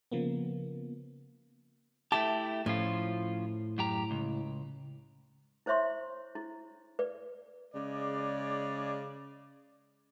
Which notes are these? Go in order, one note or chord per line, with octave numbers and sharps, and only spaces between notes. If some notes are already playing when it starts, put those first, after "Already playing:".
C#3 F3 A#3 B3
A3 E4 G4 A5
A2 F3 C#4 F4
F#2 G4 A#5
C#2
E4 C5 C#5 E5 C6 C#6
E4
B4 D5
C#3 G#3 G#4 D5